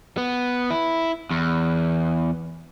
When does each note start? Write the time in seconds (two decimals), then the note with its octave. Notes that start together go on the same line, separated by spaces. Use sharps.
0.18 B3
0.70 E4
1.31 E2